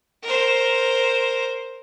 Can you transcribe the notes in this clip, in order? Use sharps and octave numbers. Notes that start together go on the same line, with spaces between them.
A#4 C5